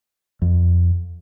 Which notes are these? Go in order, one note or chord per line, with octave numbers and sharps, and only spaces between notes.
F2